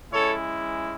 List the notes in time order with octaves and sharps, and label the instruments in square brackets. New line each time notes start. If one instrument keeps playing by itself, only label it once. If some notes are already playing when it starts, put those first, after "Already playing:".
[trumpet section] G#3 C#4 E4 A4 C#5